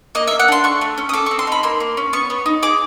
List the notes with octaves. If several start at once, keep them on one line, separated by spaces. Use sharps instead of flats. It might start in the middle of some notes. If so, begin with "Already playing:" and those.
A#3 D#5
A#3 E5
F#5
D4 C6
A3 C#6
A3
C#4
D#6
A4 D6
C#6
C4
C6
D#4 B5
A#3 C6
A#3
C#4
B3 C#6
B3
D#4
G#4 D6